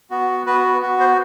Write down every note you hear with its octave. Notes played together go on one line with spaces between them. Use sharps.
B3 F#4
B3 F#4 B4
B3 F#4
C5